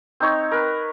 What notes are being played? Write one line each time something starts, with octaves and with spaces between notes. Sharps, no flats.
C4 D#4 C#5
A#4 B4